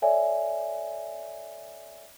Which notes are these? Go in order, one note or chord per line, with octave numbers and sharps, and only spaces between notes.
A4 C#5 D5 E5 G#5